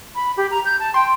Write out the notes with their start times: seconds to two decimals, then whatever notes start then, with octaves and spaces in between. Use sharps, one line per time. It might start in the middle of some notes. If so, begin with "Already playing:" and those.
0.15 B5
0.37 G4
0.51 A#5
0.65 G6
0.79 A5
0.94 G5 C6